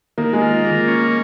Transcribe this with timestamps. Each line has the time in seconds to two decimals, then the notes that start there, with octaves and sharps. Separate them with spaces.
0.18 D#3 A#3
0.33 G#3
0.41 F4
0.65 A#3
0.88 C#4